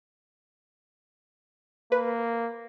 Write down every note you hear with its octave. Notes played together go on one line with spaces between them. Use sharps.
A#3 B4